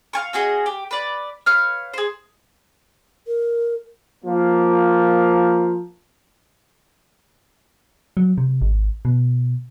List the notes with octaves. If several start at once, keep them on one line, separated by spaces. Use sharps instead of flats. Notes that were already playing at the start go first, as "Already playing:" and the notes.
F5 G#5 C#6
C#4 F#4 G#4 D#5
G4
B4 D5
B4 C#5 F5 F6
G#4 C5
A#4
F3 A#3
F#3
C3
G#1
B2